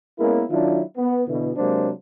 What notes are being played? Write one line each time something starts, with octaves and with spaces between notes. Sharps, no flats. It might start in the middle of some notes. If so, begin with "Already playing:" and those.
G#3 A#3 B3 C#4 E4 A#4
D#3 F#3 D4 E4 F4
B3
B2 D3 E3
C3 F#3 G#3 A#3 D4 C5